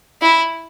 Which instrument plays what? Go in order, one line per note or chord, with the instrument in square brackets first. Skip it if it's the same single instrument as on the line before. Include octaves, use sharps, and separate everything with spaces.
[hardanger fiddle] E4